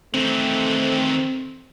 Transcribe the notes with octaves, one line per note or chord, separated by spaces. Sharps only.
D#3 E3 A3 C4